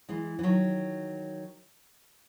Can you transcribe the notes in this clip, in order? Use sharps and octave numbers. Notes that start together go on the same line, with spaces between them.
E3 G#3
E3
D#3 F#3